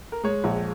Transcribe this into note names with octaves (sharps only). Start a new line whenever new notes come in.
A#4
G#3 C#5
A#1